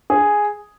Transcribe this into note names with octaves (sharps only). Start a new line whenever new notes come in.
G#4